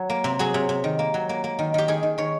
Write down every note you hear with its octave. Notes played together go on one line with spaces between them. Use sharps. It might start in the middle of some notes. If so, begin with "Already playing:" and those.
Already playing: F#3
A#3
C3
F#3 G#4
C3
C3
D#3
A#3
F#3
A#3
A#3
D#3
D#3 G4
D#3 G#4
D#3
D#3 C#5